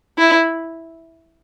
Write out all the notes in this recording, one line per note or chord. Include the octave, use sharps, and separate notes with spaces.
E4